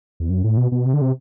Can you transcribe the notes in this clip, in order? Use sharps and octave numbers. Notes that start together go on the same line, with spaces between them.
E2
F#2
A2
B2
B2
C3
D3
C3